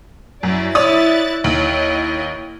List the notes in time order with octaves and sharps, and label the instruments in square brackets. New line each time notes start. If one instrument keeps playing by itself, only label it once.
[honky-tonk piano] F#2 [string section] E4 F#4 D5
[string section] E4 F#6 A6 [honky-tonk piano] C#5 D5 D#6
[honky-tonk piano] D#2 [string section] E4 C#5 D#5